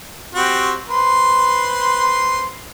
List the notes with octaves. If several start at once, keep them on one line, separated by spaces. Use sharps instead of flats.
C4 F#4 G4
B4 C5 C6